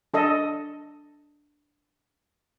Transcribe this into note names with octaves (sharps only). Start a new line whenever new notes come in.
D4 A4 D#5